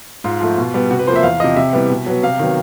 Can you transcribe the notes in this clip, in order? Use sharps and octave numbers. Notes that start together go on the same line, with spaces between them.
G#2 F4
F3 A3
B2
G3 B3
C3 F#4
B4
F3 A#3 C5 E5
E2 F5
C3 F3 D#5
C3 E5
E3 G3 B3
B2
F#3 B3
C3 F5
D#3 F#3 B3